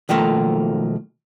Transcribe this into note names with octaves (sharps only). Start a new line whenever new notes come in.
B1 D#3 F3 A3 A#3